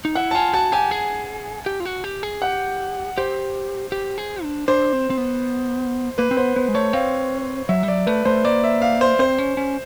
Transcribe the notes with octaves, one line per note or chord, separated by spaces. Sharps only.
D#4
E4 F#5
A5
F4 G#5
F#4 A5
G4 G#5
G#4
G4
F4
F#4
G4
G#4
G4 F#5
G4 C5
G4
G#4
D4
D4 C5
C4
C4
B3
A#3 B4
C4
B3 C5
B3 C5
G#3
A3 C#5
C4 F5
F#3 E5
G3
F#3 D5
A3 B4
A3 C5
A#3 D5
E5
F5
C5
C4 C5
C#4
C#4